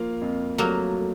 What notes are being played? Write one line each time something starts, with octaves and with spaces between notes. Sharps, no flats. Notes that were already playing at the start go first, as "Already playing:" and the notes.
Already playing: F3 A#3 F4
F2
F#3 A3 A#3
A3